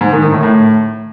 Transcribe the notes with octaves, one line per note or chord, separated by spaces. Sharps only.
G#2
D#3
D#3
A2
A2